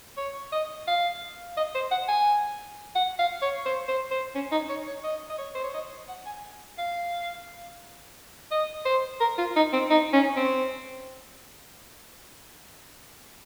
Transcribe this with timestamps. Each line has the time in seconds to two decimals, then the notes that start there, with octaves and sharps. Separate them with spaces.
0.17 C#5
0.52 D#5
0.87 F5
1.57 D#5
1.75 C5
1.91 F#5
2.08 G#5
2.95 F#5
3.19 F5
3.42 C#5
3.66 C5
3.88 C5
4.11 C5
4.35 C#4
4.51 D#4
4.69 C#5
4.87 C#5
5.04 D#5
5.30 D#5
5.38 C#5
5.55 C5
5.64 C#5
5.74 D#5
6.09 F#5
6.26 G#5
6.78 F5
8.51 D#5
8.86 C5
9.21 A#4
9.38 F4
9.56 D#4
9.73 C4
9.90 D#4
10.13 C#4
10.36 C4